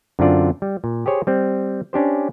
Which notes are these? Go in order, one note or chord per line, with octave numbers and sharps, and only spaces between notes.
F#2 D3 C4 D4 F4 D5
G3
A#2
G4 G#4 C5 C#5
G3 C4
C#4 D4 G4 C5